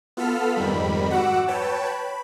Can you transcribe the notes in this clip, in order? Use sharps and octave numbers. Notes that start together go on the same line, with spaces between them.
B3 F4 A4 F6 B6
F2 G#2 D#3 G3 B5
F#4 F#5 D6 E6
B4 C#5 G5 A5
B5